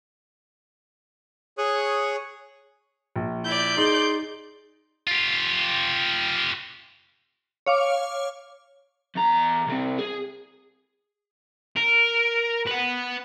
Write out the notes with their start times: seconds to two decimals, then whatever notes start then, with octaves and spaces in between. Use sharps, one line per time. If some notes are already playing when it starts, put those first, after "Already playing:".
1.58 G#4 C#5 C#6 D#6 F#6
3.16 A#1
3.45 E4 D5 G6
3.77 D#4 G#4 C6
5.07 F4 G4
7.66 C#5 F5 D6
9.16 E2 A#5
9.67 C2 C4
9.98 G#4
11.76 A#4
12.67 B4 F#5